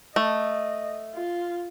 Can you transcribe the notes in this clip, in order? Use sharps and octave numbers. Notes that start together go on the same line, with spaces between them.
A3 D#5
F4